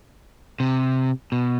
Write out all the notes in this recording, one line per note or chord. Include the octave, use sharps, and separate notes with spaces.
C3
B2